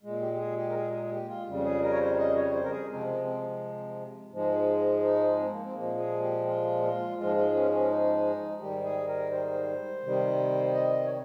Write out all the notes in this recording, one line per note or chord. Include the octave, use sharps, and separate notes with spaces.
A#2 G#3
G4
G4
G#4
G4
A#4
G#4
G#4
G#4
G4
F4
F2 C#3 G3
G#4
A#4
C#5
C5
D#5
C#5
C5
A#4
G#4
C3 F3 G#3 C4
C4
C4
G#2 F3 G#3
D#4
C4
A#3
C4
A#2 F3 G#3 A#3
G#4
G4
F4
F4
G#2 F3 G#3 F4
F4
C#4
C#4
D#4
G#2 D#3 G3 G4
G#4
A#4
C5
C3 D#3 G3
D#5
C#5